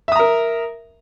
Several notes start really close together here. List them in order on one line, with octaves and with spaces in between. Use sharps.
E5 D#6 A#5 A#4